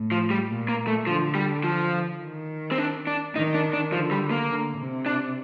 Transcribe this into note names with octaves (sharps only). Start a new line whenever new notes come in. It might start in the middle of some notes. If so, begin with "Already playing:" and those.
Already playing: A2
F3
G3
A#2
A#3
A3
D3 F3
G3
F3
D#3
C4
D4
D4
D#3 D#4
D4
D4
D3 F3
G3
A#3
D3
C3
D4